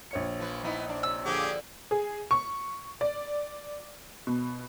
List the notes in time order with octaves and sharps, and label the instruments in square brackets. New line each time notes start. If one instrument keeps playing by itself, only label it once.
[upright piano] A#1 C#5 C#7
[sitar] F3 B4
B3 D#4 E4
D4
[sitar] C3 [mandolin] E6
[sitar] A#2 D3 F3 [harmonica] G4 G#4 D6
[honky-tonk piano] G#4
C#6
D5
B2